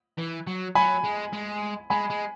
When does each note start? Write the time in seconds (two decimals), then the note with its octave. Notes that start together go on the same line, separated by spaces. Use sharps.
0.18 E3
0.47 F#3
0.75 F#3 G#5 B5
1.04 G#3
1.33 G#3
1.90 G#3 G#5 B5
2.10 G#3